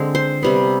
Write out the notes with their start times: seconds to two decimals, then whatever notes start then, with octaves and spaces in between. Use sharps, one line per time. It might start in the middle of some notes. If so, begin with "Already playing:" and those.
Already playing: D3 G#3 C4
0.15 C5
0.43 C3 G3 B3